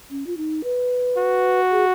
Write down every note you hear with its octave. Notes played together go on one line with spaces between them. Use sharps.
C#4
F4
D#4
B4
F#4
G#4